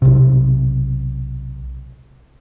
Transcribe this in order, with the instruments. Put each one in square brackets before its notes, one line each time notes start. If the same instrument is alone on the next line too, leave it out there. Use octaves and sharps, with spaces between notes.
[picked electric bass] B1 C3